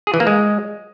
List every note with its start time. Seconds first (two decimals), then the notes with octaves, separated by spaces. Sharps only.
0.07 G#4
0.14 E3
0.20 A#3
0.27 G#3